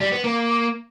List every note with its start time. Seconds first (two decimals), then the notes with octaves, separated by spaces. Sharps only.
0.01 G3
0.12 B3
0.24 A#3